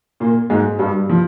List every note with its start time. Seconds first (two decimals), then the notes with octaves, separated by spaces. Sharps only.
0.20 A#2 A#3
0.50 G#2 G#3
0.79 G2 G3
1.09 F3